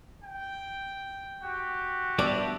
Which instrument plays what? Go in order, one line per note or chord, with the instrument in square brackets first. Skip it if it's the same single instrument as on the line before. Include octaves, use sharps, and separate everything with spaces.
[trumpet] G5
[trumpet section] F#4 G4
[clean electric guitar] G3 B3 D4 [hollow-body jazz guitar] D5 [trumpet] E5